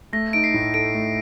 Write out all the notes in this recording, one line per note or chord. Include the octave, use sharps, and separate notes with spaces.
A3 A#6
D#4 D7
C7
A2
A4 D7
A3